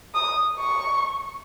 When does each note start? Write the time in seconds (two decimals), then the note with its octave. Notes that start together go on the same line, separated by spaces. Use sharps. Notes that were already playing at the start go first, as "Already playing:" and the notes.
0.14 D#6
0.59 C#6